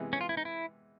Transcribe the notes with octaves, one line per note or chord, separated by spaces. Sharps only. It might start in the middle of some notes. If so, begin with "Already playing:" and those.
Already playing: C3 E3 G#3 B3
C#4
F4
E4
D#4
E4